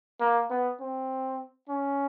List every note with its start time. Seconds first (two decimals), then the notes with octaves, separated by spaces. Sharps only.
0.20 A#3
0.50 B3
0.80 C4
1.69 C#4